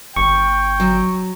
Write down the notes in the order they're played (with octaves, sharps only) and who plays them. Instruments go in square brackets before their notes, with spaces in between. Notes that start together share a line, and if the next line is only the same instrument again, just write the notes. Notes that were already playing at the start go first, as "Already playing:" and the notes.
[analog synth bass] G1 [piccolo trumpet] G5 [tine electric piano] C#6
[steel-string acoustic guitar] F#3